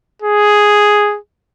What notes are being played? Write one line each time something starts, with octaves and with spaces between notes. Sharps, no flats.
G#4